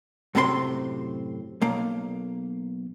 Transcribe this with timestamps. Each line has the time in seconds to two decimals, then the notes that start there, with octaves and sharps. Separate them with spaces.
0.35 F#2 A2 C3 C4 C#5 C6
1.62 B1 A#3